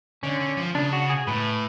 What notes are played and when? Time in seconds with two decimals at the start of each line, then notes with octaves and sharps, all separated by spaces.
0.23 D3 C#4
0.40 D3
0.57 F3
0.75 C#3 D4
0.93 F#4
1.10 G#4
1.27 A2 B4